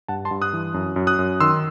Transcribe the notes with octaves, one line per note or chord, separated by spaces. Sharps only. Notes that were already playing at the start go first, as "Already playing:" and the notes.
G2 F#5 A5
A5 C6
G2
D#6 F#6
E3
F#2
F#2
D#6 F#6
F#2
D#3 C6 E6